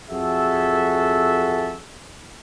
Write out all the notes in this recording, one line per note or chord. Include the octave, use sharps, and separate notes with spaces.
F2 F#4 G#4 A4 E5